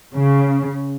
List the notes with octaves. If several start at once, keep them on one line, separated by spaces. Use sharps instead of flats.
C#3